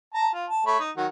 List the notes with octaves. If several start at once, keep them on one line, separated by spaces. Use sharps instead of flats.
A5 A#5
F4
A5
A3 C#5 B5
D#4
D#3 F#3 F#5